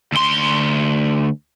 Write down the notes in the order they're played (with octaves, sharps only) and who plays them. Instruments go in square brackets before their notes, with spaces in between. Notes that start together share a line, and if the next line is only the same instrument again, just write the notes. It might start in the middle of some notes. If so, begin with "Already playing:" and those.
[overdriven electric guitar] D2 C6